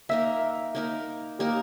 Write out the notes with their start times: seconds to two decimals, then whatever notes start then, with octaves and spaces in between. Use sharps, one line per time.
0.09 A#3 D#4 A#4 E5
0.75 A#3 D#4 A#4
1.39 A#3 D#4 G4 A#4